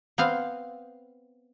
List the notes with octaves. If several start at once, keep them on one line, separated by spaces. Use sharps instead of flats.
B3 C4 F5